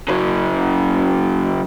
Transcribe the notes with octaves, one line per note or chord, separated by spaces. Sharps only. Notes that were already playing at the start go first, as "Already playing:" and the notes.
C#3 F#3